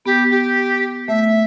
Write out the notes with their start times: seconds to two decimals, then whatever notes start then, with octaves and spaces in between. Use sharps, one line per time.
0.06 B3 G4
0.31 G4
1.08 A3 E5